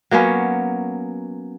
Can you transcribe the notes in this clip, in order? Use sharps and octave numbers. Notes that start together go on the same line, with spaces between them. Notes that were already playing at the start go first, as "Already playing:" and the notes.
F#3 A#3 B3 C#4